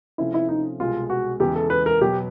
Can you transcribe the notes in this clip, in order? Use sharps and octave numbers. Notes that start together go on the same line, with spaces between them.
C3 F3 A3 C#4 E4
E4
D#4
C2 B2 G#3 F4
F#4
E2 C#3 E3 G#3 G4
A4
B4
A#4
B2 F#3 B3 G4